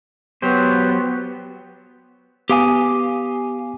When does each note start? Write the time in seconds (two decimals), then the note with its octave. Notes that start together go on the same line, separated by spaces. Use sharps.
0.42 F#3 B3 G4 C5
2.50 B3 G4 F5 G#5 D6 D#6